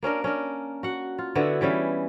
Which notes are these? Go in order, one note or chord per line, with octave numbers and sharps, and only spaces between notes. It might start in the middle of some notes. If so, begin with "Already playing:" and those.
A#3 C#4 D4 A#4
C#4 D4 A#4
F#4 F#5
F4
D3 B3 E4 F#4
E3 G3 C#4 E5